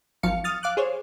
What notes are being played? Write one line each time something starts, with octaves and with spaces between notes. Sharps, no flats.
G#1 F3 F#3 F5 C#7
D#6 F6 A6
F5 D6 F#6
G#4 C5 C#5